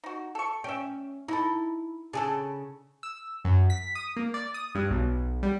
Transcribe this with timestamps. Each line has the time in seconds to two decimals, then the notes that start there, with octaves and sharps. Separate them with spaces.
0.04 D#4 F#4
0.35 A4 C#6
0.64 C#4 E5 G5
1.28 D#4 E4 A4
2.13 C#3 D4 G#4 A4
3.03 E6
3.45 F#2
3.70 B6
3.95 D#6
4.16 A#3
4.34 D5
4.54 D#6
4.75 G2
4.90 B1
5.43 G3